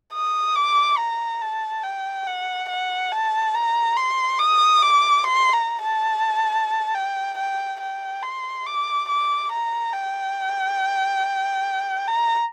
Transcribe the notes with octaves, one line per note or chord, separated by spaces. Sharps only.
D#6
D6
A#5
A5
G5
F#5
F#5
A5
A#5
C6
D#6
D6
C6
A#5
A5
G5
G5
G5
C6
D6
D6
A#5
G5
A#5